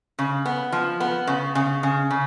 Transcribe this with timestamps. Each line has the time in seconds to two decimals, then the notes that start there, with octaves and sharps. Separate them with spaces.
0.19 C#3
0.45 B3
0.72 F3
1.00 B3
1.27 C#3
1.55 C#3
1.83 C#3
2.11 C#3